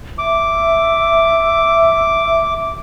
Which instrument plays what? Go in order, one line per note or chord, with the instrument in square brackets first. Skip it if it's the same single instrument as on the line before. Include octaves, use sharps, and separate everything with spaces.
[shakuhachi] E5 [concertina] D6